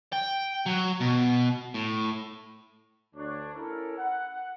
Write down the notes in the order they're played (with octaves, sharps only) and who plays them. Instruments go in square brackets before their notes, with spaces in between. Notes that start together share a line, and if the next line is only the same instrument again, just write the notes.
[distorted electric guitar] G5
F#3
B2
A2
[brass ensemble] D2 D4 C#5
C#4 E4 A4 A#4
F#5